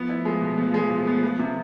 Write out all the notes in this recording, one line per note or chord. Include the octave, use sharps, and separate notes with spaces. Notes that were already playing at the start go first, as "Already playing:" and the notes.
Already playing: F3 A3 B3
E4
G#3
B2
B3
G#3
B2
B3
B3
C3